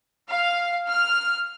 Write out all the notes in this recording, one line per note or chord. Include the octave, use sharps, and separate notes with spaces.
F5
F6